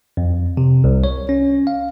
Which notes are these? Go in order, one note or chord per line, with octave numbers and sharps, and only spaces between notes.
F2
C3
C2
C#5
C#4
F5